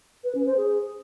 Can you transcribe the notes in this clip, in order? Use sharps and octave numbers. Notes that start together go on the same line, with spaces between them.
B4
C#4
C5
G#4